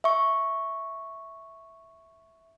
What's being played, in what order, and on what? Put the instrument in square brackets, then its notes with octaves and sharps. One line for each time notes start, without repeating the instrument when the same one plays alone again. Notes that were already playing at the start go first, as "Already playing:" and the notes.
[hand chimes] E5 C#6